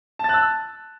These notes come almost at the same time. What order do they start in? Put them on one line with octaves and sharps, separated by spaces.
A5 A6 F#6 E6